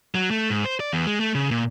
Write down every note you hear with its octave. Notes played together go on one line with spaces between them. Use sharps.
F#3
A3
G#2
C5
D5
E2
G#3
A3
C#3
A#2